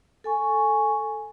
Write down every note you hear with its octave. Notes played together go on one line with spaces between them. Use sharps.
A4 G#5 C#6